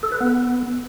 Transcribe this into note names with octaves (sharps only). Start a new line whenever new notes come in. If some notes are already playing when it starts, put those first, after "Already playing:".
A4
B4
B3